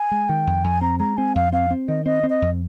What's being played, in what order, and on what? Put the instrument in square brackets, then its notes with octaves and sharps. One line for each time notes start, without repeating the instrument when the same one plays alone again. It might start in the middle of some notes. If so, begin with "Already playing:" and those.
Already playing: [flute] G#5
[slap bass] G#3
[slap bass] D#3 [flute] G5
[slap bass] F2
[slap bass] F2 [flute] G#5
[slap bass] C4 [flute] A#5
[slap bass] G#3 [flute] A#5
[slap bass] C4 [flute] G#5
[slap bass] F2 [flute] F5
[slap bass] C4 [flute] F5
[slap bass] C4
[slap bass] D#3 [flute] D#5
[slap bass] C4 [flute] D#5
[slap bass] C4
[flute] D#5
[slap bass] F2